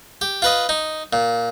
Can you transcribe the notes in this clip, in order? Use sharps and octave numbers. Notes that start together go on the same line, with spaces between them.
G4
F4 B4 D#5
D#4
A#2